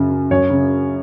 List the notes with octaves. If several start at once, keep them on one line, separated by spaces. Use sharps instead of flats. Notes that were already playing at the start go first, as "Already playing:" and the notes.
Already playing: F#2 C#3
C#3
F#2 C#5
C#3